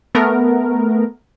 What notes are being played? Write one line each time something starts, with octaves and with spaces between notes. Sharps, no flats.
A3 B3 A#4